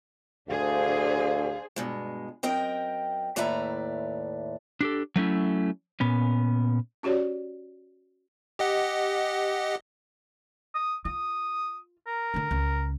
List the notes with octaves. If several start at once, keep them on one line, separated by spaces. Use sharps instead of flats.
D2 D4 G#4 C5 F5
G2 B2 G#3
F#2 C4 A#4 D#5 G5
D#2 A2 B4 D5 E5 A#5
D4 G4 A4
F#3 A3 C#4 E4
A#2 B3 C#4
C#4 F#4 G4 C#5 D5
G4 D#5 F#5
D#6
F4 D#6
A#4
D3 D4
C#2